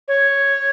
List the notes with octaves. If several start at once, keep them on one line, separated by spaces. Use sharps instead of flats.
C#5